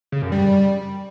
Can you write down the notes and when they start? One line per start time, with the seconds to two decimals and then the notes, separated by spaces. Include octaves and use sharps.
0.12 C#3
0.22 F#2
0.32 G3